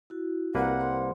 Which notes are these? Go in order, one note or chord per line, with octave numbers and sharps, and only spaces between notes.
E4 F#4
C2 A#3 B4 F#5
C5 C6